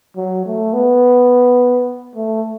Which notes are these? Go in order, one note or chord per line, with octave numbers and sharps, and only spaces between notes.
F#3
A3
B3
A3